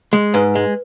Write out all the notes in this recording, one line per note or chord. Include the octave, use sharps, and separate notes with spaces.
G#3
G#2 B4
G#3